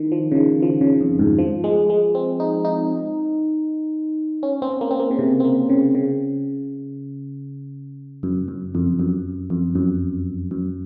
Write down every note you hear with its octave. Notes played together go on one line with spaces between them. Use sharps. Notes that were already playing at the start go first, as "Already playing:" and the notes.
Already playing: D#3
F3
C#3
D#3
F3
C#3
F2
G#2
F3
G#3
G#3
C4
D#4
D#4
C#4
C4
A#3
C4
A#3
C#3
C3
C4
A#3
C#3
C#3
F#2
F#2
F2
F#2
F2
F#2
F#2